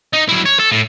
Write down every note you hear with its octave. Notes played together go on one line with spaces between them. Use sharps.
D#4
F#3 E4
C#5
A4
A2